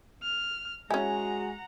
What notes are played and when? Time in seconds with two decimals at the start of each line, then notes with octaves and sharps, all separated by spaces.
0.23 F6
0.90 G#3 C#4 E4 F#4 F#5 G#5 A#5